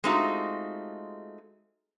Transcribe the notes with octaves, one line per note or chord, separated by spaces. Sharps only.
G#3 A3 C4 D#4 F4 F#4